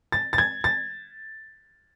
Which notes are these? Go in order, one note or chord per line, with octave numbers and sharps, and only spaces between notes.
A6
A6
G#6
A6